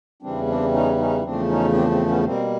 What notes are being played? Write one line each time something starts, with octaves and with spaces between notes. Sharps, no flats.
E2 C#3 E3 G3 C4 D4
C4 D4
C#4 D#4
C#4 D#4
E2 C#3 F3 A3 C4 D4
C#4 D#4
C4 D4
C4
B3 C#4
B2 G3 A#3 C4